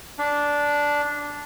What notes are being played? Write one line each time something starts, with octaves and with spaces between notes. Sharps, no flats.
D4